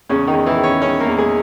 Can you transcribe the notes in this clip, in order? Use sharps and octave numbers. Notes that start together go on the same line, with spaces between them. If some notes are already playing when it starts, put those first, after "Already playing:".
E2 C#3 C#4
D#3 D#4
E2
E3 E4
D#3
C#4 C#5
D#3 C#4 C#5
A#3 A#4
E2
G#3 G#4